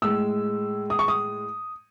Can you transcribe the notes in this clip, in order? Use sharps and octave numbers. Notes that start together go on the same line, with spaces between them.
A2 G#3 E6
D#6
C#6
D#6